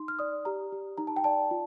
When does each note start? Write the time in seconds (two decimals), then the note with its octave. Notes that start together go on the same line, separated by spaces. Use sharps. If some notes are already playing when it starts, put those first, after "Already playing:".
Already playing: D#4 C6
0.08 F6
0.19 D5 D#6
0.45 G4 A#5
0.72 G4
0.98 D#4 A#5
1.07 A5
1.16 G5
1.24 D5 A5
1.51 F4